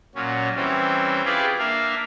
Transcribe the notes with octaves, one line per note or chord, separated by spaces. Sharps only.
A#2 F#3 C#4
E3 G3 C4 C#4
E4 F4 G4 G#4 B4 D5
A#3 D4 E5 F5